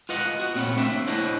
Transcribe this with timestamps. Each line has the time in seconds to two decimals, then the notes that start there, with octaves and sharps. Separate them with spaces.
0.09 F4 B4 D#5 F#5
0.39 B3 F#4
0.55 A#2 C4 C#4 F#5 B5
0.77 A3 A#3 C4 D4 E5
1.07 D4 E4 C5 C#5 D#5 F#5